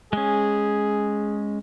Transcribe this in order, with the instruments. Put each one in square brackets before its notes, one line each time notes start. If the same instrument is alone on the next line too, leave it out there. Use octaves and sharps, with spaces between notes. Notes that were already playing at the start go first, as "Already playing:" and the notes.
[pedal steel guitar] G#3 C#4 [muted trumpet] G#4